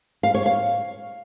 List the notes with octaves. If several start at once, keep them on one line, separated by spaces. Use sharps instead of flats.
F5
C#5
F5